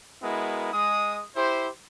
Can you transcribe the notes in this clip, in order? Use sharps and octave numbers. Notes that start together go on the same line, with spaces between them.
G#3 B3 E4 F#4 A#4
G#3 D#6
E4 G4 C5